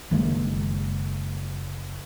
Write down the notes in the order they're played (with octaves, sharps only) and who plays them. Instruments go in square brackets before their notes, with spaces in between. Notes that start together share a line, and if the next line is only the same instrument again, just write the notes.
[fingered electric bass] F#1 D#3 G#3 A#3